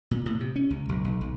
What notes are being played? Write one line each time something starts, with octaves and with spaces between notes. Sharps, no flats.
A#2
A2
C3
C#4
C#2
B1
B1
B1